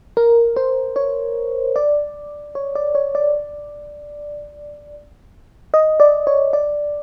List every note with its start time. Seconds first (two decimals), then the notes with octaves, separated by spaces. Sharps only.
0.17 A#4
0.56 C5
0.96 C#5
1.76 D5
2.55 C#5
2.75 D5
2.95 C#5
3.15 D5
5.74 D#5
6.00 D5
6.27 C#5
6.53 D5